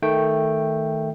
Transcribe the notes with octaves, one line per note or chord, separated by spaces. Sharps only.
D#3 A3 G5